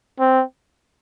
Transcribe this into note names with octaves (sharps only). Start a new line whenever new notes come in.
C4